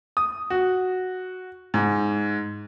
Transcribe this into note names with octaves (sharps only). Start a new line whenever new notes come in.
D#6
F#4
G#2